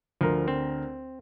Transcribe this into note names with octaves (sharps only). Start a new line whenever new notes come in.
D2 F3 A#4
C4